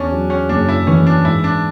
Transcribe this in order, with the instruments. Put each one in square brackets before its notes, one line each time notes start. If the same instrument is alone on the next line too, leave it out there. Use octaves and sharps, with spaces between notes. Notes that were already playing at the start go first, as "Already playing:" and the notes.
Already playing: [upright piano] E2 [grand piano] C#4 D4
[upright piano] F#3
[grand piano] C#4
[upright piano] F#1 [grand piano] D4
[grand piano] E4
[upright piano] E3 [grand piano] C#4
[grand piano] D4
[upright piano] G#2 [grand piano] E4
[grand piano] D4